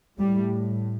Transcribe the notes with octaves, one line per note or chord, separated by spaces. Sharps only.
A2 G3